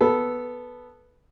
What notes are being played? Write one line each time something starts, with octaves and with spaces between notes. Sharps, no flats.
B3 A4